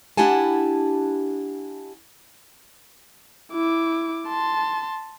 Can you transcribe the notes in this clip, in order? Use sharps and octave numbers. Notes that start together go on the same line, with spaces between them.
D4 E4 G4 F#5 G#5 A5
E4 D6
A5 C6